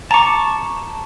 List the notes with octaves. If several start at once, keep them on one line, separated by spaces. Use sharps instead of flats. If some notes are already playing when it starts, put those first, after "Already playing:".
A5 A#5 C#6 D6